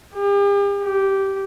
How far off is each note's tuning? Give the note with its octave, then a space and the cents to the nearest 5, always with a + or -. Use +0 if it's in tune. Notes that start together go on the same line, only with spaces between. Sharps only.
G4 +40
G4 -10